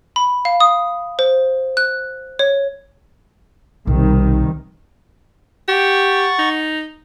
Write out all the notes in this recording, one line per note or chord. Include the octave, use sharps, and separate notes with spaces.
B5
F5
D#6
C5
F#6
C#5
B1 C3 D#3 G3
G4 F#5 C#6 A6
D#4